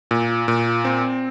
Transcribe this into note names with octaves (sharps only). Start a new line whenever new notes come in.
A#2
A#2
C4